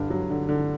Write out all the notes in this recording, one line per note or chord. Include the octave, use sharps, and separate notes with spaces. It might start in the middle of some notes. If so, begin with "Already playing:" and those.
Already playing: G2 D3
F#3
D3
D3